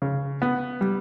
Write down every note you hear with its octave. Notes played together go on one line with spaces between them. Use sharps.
C#3
B3
G3